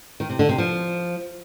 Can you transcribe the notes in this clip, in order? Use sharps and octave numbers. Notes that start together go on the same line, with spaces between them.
D#3
C3
D3
C3
F3